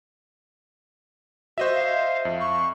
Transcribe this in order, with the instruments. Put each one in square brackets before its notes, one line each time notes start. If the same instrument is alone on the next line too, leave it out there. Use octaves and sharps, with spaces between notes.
[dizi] F#4 [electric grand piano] C5 D#5 E5
[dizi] F5
[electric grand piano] F2
[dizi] C#6